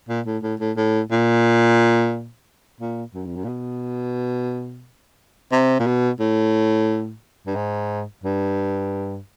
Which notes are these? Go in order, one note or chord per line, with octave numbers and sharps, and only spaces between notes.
A#2
A2
A2
A2
A2
A#2
A#2
F#2
F2
F#2
A#2
B2
C3
A#2
B2
A2
G2
G#2
G2